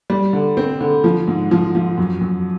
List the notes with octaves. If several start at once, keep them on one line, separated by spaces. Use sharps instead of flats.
G3
D3
C4
D3
F3
G#2
F3
F3
F#2
F#2